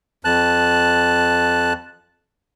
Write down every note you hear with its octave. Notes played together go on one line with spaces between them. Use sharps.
F2 A5 F#6